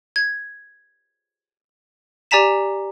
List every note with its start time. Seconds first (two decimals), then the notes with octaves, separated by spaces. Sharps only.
0.16 G#6
2.31 G4 D5 G#5 A#5 B6 E7